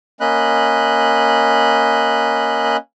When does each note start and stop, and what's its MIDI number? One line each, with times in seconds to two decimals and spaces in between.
0.21 2.77 58
0.21 2.77 61
0.21 2.77 75
0.21 2.77 83
0.21 2.77 90